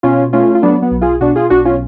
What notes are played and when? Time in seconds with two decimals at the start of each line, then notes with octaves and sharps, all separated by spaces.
0.03 B2 C#4 F4
0.33 A3 C#4 F4
0.55 F4
0.63 F#3 B3 D4
0.82 B3
0.91 B1
1.01 F4 G#4
1.21 B2 D4 F#4
1.35 F4 G#4
1.50 B1 D4 F#4
1.65 C#4 F4